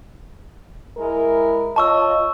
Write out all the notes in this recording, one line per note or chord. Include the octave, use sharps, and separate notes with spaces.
G#3 E4 A#4
F4 C#5 D#5 A5 C#6 E6